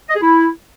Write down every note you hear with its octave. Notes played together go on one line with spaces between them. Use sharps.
D#5
G#4
E4